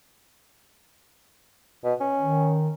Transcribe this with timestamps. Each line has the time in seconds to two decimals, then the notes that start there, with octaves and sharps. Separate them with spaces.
1.84 B2
2.00 C#4
2.20 D#3